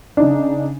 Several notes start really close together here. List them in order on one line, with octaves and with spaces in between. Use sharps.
D4 D#4 C#3